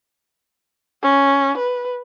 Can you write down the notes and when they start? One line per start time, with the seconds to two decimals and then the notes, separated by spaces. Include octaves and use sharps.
1.03 C#4
1.57 B4